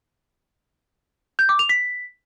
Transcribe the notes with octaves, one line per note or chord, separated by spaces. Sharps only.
G6
D6
F7
B6